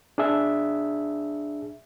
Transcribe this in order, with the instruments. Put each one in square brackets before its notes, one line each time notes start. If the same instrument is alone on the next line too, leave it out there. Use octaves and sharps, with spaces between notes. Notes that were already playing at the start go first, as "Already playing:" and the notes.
[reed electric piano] D4 G#4 E5